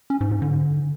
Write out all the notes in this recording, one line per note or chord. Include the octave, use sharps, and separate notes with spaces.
C#4
G#2
G#2
D3